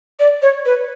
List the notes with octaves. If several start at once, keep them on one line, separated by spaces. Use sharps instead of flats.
D5
C#5
B4